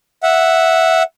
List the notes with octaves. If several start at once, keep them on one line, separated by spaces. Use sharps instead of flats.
E5 F#5